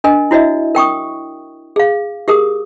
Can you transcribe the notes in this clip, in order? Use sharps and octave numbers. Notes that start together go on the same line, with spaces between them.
D4 A#4 D#5 G#5
E4 F#4 C#5 D#5 E5
A#4 G5 C#6 D#6
G#4 F5
G4 G#4 A#4 D#6